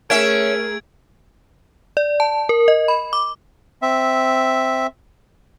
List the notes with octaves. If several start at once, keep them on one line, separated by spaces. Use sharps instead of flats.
A3 C#4 G#4 A#4 E5 G#6 D7
D5
A5
A#4
D#5
B5
D6
C4 E5